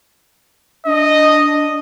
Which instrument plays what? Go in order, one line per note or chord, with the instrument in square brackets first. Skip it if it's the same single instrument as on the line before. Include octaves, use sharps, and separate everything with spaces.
[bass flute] D4 [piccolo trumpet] D#5